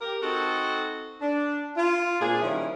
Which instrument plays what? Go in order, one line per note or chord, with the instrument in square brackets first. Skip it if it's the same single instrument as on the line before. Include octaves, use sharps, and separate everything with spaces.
[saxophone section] G4 A#4
C4 D#4 F#4 A4
D4
F4
A#2 C4 D4 G#4
D#3 F3 G3 C#4 E4